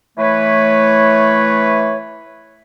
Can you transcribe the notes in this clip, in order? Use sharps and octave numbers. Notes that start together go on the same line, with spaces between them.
E3 A3 B4 C#5